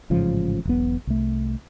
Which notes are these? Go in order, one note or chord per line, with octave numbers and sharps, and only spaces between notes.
A1 G#2 C#3 F3
E1 B1 B3
C2 A3